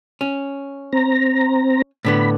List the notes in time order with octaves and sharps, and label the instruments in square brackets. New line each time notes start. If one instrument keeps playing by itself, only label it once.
[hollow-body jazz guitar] C#4
[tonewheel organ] C4 A#5
[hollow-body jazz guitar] A2 D3 B3 [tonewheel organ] B5